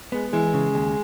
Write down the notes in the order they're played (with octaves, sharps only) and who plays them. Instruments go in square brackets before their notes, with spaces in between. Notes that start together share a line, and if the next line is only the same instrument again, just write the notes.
[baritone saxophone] G#3 [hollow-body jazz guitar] B3
[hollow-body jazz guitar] E3 [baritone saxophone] G#3
[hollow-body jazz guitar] C#3
D#2